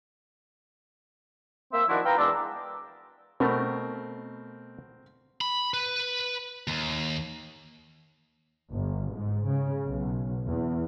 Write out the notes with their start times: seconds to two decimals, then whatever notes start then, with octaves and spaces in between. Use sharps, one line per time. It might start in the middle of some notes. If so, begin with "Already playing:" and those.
1.73 A#3 C4 E5
1.89 D#3 F3 D4 E4 F#4
2.05 B4 F5 G5 A#5
2.18 E2 G#3 D4 D6 E6
3.40 B2 A3 C4 A#4
5.41 B5
5.74 B4
6.68 D#2
8.71 G1
9.14 G#2
9.48 C#3
9.84 B1
10.47 E2